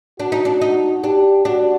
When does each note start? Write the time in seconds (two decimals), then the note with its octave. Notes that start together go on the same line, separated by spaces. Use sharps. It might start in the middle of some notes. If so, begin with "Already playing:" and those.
0.19 D4 F#4
0.32 D#4
0.45 D4
0.61 D#4
1.04 D4 G4
1.45 D4 F#4